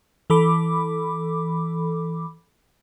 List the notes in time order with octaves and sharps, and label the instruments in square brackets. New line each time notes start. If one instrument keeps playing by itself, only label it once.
[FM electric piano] E3 A4 B5 D6